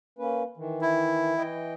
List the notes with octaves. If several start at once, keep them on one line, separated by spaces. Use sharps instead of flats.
A#3 C#4 B4
D#3 E3
E4
E3 D#5 G5